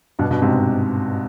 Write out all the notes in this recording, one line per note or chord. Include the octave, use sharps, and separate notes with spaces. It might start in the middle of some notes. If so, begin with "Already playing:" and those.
G2 B2
G2 B2
G#2 C3